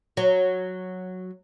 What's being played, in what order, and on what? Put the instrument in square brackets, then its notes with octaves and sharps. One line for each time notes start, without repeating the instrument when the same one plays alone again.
[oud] F#3